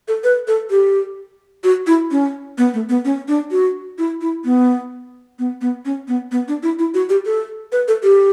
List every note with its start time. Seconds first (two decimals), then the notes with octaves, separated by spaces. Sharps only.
0.08 A4
0.24 B4
0.47 A4
0.70 G4
1.64 F#4
1.87 E4
2.11 C#4
2.58 B3
2.74 A3
2.89 B3
3.05 C#4
3.28 D4
3.51 F#4
3.98 E4
4.21 E4
4.45 B3
5.39 B3
5.61 B3
5.85 C#4
6.08 B3
6.32 B3
6.48 D4
6.63 E4
6.79 E4
6.94 F#4
7.09 G4
7.26 A4
7.72 B4
7.88 A4
8.03 G4